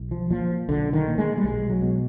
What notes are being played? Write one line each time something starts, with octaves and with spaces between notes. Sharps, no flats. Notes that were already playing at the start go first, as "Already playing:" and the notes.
Already playing: B1
F3
A#2 F3
B1 D3
D#3
A#2
G#3
G3
B1 G#3
F#3
B2